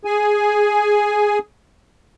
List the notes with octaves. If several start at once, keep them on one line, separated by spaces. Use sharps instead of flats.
G#4 G#5